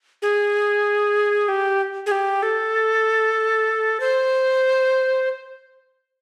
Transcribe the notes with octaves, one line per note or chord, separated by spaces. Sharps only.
G#4
G4
G#4
G4
A4
C5